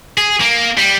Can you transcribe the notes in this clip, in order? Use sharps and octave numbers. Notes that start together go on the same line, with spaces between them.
G#4
A#3
G3